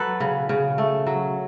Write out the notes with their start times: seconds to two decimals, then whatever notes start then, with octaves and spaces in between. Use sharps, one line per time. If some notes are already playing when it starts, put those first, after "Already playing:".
Already playing: F#3 F#4 A4 B4
0.20 C#3
0.49 C#3
0.78 A3
1.07 F#3